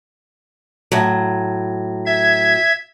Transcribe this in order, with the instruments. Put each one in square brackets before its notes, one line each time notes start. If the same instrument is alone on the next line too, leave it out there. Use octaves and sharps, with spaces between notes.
[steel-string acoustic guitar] A2 F#3
[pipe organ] E5 G#6